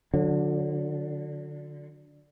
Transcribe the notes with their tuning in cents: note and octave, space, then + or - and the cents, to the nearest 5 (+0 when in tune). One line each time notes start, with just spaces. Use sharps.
D3 +0 F#3 -35